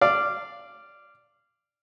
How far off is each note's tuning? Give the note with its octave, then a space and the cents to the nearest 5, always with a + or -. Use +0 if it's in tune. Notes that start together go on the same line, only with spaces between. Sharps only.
D5 +0 F5 -20